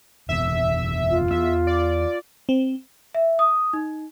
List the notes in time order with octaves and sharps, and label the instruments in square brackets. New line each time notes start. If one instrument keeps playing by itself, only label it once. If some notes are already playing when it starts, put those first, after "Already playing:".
[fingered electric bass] F#1 E2 B2 [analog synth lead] E5
[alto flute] F4
[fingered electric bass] E2 B3 [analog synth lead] E5
[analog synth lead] D5
[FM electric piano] C4
[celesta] E5
D#6
D#4